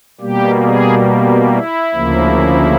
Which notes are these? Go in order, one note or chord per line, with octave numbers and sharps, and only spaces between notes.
B2 G3 A#3 G4
G#4
E4
D2 C#3 F3 A#3